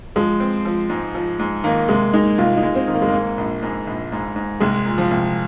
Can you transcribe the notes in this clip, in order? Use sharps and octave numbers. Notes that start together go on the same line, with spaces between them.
F3 G#3
C4
F3
G#2
F3
G#2
D#3 A#3
C3 G#3
G#3 D#4
C2 F4
D#4
G#3
C4
D#3
A#3
G#3
G#2 A#3
A#1
G#2
A#1
G#2
G#2
C2 G#3
A#2
F3
C2